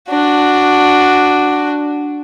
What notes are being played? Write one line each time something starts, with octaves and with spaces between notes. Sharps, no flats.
D4 F#4